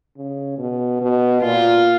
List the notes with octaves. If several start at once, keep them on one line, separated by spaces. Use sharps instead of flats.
C#3
B2
B2
A#2 F4